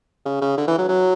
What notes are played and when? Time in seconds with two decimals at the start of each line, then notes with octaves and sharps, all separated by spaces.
0.25 C#3
0.41 C#3
0.58 D3
0.68 E3
0.78 F#3
0.89 F#3